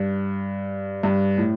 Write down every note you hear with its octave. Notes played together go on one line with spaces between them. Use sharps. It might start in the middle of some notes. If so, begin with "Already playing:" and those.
Already playing: G2
G2
A2